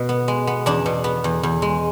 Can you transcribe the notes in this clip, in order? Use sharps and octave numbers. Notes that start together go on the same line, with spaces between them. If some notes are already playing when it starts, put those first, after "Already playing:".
Already playing: B2
B3
G#3
B3
E2 D4
B2
B3
E2
E2
G#3